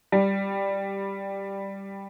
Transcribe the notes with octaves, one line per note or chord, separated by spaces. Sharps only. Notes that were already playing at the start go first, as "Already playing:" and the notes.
G3